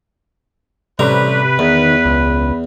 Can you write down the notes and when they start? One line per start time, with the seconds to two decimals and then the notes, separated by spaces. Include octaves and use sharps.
0.99 A1 C3 G3 B4 A#5
1.59 E2 D#3
2.05 C#2